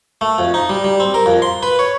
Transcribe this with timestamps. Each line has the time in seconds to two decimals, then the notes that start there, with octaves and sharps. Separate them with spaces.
0.21 A3
0.38 F2
0.54 D#4
0.69 G3
0.84 G3
1.00 C4
1.14 A#4
1.26 F2
1.42 C6
1.63 B4
1.79 C#5